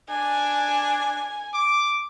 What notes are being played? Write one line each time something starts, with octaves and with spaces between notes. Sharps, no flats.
D4 G#5
D6